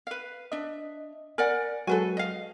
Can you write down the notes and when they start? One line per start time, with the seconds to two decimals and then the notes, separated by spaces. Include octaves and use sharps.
0.07 B4 F5
0.52 D4 D#5 E5
1.38 A#4 D5 F#5 G#5
1.87 F#3 G#3 F#4 A4 B4 G#5
2.17 D#5 F5